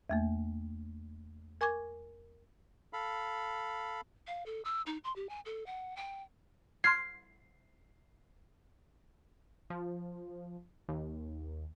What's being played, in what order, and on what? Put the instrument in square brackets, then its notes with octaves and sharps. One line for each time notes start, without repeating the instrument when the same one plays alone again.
[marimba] E2 A3 A#3
A#4 G#5 C#6 D6 G#6
[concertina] A4 F5 B5
[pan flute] F5
A4
E6
D#4
C6
G4
G#5
A4
F#5
G5
[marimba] C6 F6 G#6 [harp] C7
[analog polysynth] F3
D#2